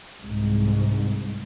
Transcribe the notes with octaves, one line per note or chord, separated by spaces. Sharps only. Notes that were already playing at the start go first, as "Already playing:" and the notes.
C2 G#2